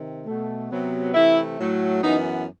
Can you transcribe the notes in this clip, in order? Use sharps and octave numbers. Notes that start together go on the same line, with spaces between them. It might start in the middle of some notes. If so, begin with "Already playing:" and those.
Already playing: C3 D#3
B2 A3
C3 F#3 B3
C3 E3 A3 E4
A2 F#3 A3
F#2 E3 B3 D#4